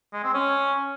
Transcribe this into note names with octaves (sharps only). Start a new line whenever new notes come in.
G#3
C4
C#4